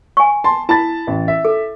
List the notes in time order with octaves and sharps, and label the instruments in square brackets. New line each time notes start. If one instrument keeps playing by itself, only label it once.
[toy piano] G#5 C#6
[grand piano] A5 C6
[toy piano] E4 [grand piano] A5 B5 A6
[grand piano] A1
E5
[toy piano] A4